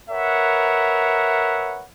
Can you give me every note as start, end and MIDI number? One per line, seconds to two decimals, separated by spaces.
0.10 1.83 70
0.10 1.83 71
0.10 1.83 73
0.10 1.83 76
0.10 1.83 78